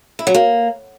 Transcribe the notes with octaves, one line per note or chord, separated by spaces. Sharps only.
E4
F#3
A#3